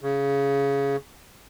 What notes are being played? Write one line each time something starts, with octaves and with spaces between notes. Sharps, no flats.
C#3